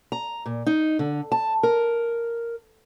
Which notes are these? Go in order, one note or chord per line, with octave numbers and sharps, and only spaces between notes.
A#5
A#2
D#4
D3
A5
A#4